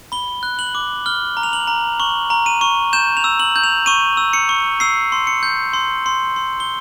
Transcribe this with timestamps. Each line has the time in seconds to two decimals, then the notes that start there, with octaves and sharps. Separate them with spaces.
0.12 B5 G7
0.43 F#6
0.59 F#7
0.75 D6
1.06 F6 G7
1.37 A#5
1.43 F7
1.53 F#7
1.67 A#5
2.00 C#6 F#7
2.30 A#5
2.46 D#7
2.61 C#6
2.93 G6 E7
3.17 F7
3.24 E6
3.40 F#7
3.56 G6
3.64 F7
3.86 C#6 D#7
4.17 E6
4.33 C#7
4.49 C#6
4.80 E6 C7
5.12 C6
5.27 C#7
5.43 G6
5.73 C6
6.06 C6
6.36 C6
6.60 G7